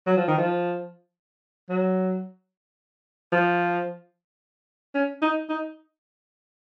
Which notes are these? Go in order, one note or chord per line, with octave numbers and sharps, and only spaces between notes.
F#3
F3
D#3
F3
F#3
F3
C#4
D#4
D#4